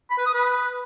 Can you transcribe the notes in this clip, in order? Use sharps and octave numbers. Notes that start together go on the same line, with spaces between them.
B5
B4
D#6
B4